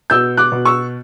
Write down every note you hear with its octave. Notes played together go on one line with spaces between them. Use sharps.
B2 E6 G6
D6 F#6
B2
C#6 E6